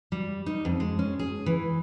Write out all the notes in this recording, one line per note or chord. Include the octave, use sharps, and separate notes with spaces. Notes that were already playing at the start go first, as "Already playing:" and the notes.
G3
D#4
F2
G#3
C#4
G#4
E3